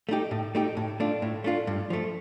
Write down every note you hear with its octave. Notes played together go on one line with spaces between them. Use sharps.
A3 D#4 G4
A2
A3 D#4 G4
A2
A3 D4 F4
A2
A3 D4 F4
G2
F3 A3